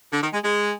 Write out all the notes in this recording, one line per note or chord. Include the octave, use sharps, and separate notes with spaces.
D3
D#3
G#3
G#3